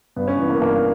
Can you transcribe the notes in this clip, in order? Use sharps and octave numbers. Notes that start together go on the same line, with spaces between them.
G2 B3
C#4
E3 B3
A#3
G2 A#3